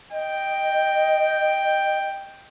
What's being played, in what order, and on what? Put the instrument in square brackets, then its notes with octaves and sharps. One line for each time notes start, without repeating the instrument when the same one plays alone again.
[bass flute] D#5 [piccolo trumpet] G5